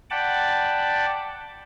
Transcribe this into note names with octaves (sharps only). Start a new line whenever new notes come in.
D5 F#5 G5 A5 B5 D6